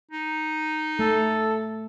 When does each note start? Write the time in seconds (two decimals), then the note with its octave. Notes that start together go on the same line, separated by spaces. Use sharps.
0.11 D#4
0.99 A3 A4